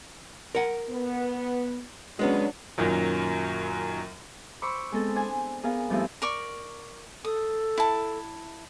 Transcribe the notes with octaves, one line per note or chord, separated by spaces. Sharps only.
A#4 F#5
B3
F#3 G#3 B3 C#4 D4
F#2 A#2 D#3 F#3
C5 B5 C#6 D6 E6
G#3 B3 C4 A4
D4 C5 G#5
B3 G#4 A#4 F5
G2 F3 A3 B3 C4 E4
A#4 D5 C#6
A4 D#6
E4 A5